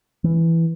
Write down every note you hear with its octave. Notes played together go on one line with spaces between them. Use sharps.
E3